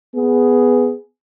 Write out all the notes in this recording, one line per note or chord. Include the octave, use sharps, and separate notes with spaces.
B3 G#4